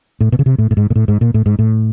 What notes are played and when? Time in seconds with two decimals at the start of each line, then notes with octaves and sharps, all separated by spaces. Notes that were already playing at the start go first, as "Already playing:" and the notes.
0.21 A2
0.32 B2
0.39 C#3
0.46 C3
0.58 A2
0.71 A2
0.77 G#2
0.90 A#2
0.96 A2
1.08 G#2
1.21 A#2
1.34 A2
1.46 G#2
1.59 A2